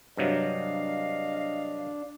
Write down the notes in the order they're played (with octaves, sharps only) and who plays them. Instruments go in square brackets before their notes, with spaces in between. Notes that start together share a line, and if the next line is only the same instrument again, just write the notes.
[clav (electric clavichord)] G2 C3 F#3 [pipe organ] D4 [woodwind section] D#5 F5